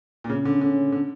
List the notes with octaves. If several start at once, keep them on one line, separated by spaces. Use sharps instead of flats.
A#2
C#3 C#4
D3
D3
D3